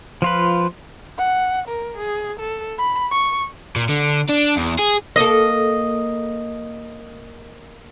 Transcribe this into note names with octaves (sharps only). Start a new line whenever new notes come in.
F3 F4 B4
F#5
A#4
G#4
A4
B5
C#6
A#2
D3
D4
E2
G#4
A#3 A4 D#5